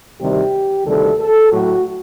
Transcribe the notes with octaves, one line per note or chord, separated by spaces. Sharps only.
D2 C3 D#3 G3 G4
D2 C3 D#3 G3 A4
A4
A2 F#3 F#4